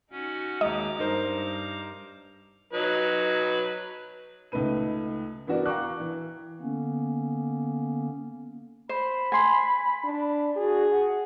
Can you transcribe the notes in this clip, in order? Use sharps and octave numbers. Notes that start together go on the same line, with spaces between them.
C#4 D#4 F#4
D#2 G#3 D#5 A#5 D6
G2 D#4 A#4 C5
F#3 D#4 B4
C#2 A3 D#4 B4 D#7
E3 B3 D4 F#4 A#4 D5
F5 G5 A#5 C#6 D6 F#6
E3
D3 A#3 B3 C#4
C5 B5
G#5 C6
D4
F#4 G#4 D5
F#5